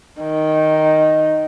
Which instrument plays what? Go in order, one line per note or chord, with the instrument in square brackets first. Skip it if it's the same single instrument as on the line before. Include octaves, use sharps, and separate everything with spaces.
[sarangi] D#3